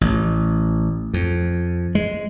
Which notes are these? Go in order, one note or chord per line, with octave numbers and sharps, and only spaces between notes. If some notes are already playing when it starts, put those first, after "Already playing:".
A1
F2
G#3